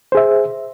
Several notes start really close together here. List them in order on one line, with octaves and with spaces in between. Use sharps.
C5 G#4 E5